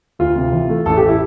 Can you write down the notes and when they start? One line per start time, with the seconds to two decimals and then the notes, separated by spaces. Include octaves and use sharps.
0.19 D2 F4
0.36 C3
0.52 E3
0.69 A3
0.86 A1 A4
0.97 G4
1.08 E4